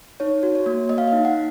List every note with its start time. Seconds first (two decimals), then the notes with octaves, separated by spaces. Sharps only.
0.20 D#4 C#5
0.43 F#4
0.55 C#5
0.66 A#3
0.89 A#3 D#5
0.98 F5
1.07 D#5
1.13 D#4
1.25 F#5